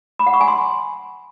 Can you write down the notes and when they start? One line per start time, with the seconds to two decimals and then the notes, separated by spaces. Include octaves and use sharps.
0.19 B5
0.27 F#5
0.34 C#6
0.41 G#5
0.48 C6